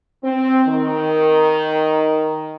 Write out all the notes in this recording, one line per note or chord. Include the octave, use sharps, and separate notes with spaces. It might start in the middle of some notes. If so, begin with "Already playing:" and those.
C4
D#3